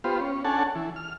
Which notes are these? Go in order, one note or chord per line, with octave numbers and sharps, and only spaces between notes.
B3 F4 G4 C5
C#4
C#4 D4 A4 F#5 G#5 A5
E3
F6